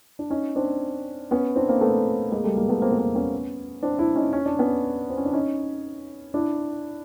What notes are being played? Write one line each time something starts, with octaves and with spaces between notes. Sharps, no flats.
D4
C#4 D#4
C4 D4
B3 C#4
C4 D4
A#3 C4
A3 B3
G#3 A#3
G3 A3
G#3 A#3
A3 B3
A#3 C4
B3
A#3 C4
B3 C#4
C4 D4
D4 E4
C#4 D#4
C#4
D4
B3 C#4
C4
C#4
D4
C#4 D#4
D4 E4